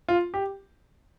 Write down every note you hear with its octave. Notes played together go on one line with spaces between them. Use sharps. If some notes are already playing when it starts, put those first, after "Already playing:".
F4
G4